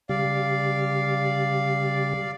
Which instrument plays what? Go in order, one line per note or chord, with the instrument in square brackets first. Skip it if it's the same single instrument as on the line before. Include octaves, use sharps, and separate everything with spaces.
[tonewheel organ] C#3 G3 G4 [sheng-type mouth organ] D5 F5